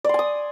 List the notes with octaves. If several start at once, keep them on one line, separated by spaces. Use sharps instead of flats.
D5 G#5 C6 D#6